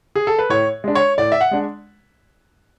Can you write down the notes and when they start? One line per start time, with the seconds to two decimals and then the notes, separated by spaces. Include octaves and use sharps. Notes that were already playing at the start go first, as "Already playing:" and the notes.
0.16 G#4
0.27 A4
0.39 B4
0.49 A2 C#5
0.84 G#3 D4
0.95 C#5
1.18 A2 D5
1.32 E5
1.41 F#5
1.51 G#3 D4